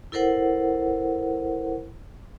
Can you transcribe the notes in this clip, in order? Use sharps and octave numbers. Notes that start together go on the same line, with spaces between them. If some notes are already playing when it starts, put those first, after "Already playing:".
E4 A4 A#4 C5 F#5